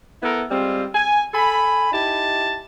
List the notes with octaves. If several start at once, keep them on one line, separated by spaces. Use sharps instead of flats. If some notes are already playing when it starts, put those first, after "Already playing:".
B3 E4 A4 A#4
G3 G#3 C4 F4
G#5
A4 G#5 B5
D#4 E4 G4 A5